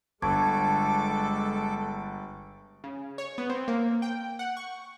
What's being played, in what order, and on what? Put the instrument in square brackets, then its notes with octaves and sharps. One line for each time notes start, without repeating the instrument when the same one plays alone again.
[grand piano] G1 [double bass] G#3 [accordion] A4 D6 [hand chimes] A5 C#6 G#6
[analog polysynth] C#3
C#5
B3
C4
A#3
G5
F#5
C#6